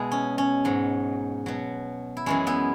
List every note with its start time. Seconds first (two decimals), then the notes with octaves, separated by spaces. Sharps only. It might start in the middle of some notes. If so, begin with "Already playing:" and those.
Already playing: B2 G#3 E4 G#4
0.12 C#4
0.38 C#4
0.65 G#2 F#3
1.46 B2 F#3
2.17 E4
2.26 F#2 E3 G#3 C#4
2.47 B3 E4